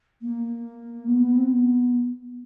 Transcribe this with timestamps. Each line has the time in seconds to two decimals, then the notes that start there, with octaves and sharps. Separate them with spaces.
0.21 A#3
1.06 B3
1.19 B3
1.34 C4
1.48 B3